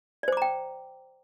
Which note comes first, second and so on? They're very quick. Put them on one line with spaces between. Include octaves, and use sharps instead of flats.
D5 C5 D6 A#5 G5